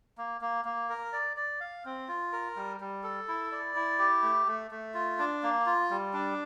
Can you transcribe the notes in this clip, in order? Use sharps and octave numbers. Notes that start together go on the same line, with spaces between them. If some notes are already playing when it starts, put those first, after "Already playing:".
A#3
A#3
A#3
A#4
D5
D5
F5
C4
F4
A#4
G3
G3
A4
E4
D5
E4
G4
A3
A3
A3
F4
D4
A#3
F4
G3
D4